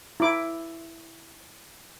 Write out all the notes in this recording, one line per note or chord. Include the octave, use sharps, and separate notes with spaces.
E4 D6